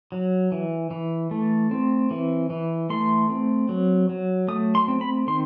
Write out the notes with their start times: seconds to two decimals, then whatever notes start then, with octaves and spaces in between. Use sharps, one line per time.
0.12 F#3
0.52 E3
0.91 E3
1.31 A3
1.71 C4
2.11 E3
2.50 E3
2.90 A3 C6
3.29 C4
3.69 F#3
4.09 F#3
4.48 A3 D#6
4.75 C6
4.88 C4
5.01 B5
5.27 D#3 C6